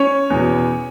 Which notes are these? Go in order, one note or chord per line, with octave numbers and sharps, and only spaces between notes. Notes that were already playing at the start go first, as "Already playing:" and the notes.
Already playing: C#4 C#5
E2 B2